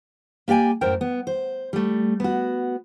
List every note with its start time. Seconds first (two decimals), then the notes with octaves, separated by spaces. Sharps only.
0.48 A#3 G4 D5 G5 G#5
0.81 F#2 A2 A#4 C5 G5
1.01 B3
1.27 C5
1.73 G3 A3
2.20 B3 F#4